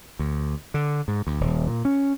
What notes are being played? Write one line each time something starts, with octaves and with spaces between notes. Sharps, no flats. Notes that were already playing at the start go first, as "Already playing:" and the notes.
D2
D3
G#2
D2
D#1
A#2
C#4